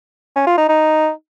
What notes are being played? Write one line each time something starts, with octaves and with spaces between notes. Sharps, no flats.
C#4
F4
D#4
D#4